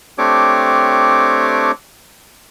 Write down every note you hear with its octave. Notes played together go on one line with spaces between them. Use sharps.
A3 C4 D4 G4 C#5 D6